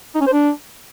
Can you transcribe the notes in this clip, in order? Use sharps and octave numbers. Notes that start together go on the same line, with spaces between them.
D#4
C#4
C5
D4